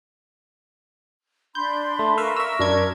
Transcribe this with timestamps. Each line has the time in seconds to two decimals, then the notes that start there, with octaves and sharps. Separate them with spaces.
1.55 D4 B5 C6 G6
1.99 A3
2.17 A#4 B4 E5 F5 C#6
2.37 E5 E6
2.59 F#2 D4 G#6